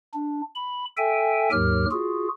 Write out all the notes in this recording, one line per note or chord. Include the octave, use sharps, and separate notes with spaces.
D4
B5
A4 E5 G5 G#5
D#2 G#2 F#3 G4 A#4 F6
F4 F#4 G#4